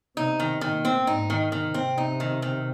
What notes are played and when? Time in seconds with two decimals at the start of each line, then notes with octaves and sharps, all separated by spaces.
0.17 C3 D#4
0.40 D#3
0.61 A#2 D#3
0.85 C4
1.07 G#2 D#4
1.30 D#3
1.52 D#3
1.67 C3
1.74 C4
1.98 D#4
2.20 D#3
2.42 D#3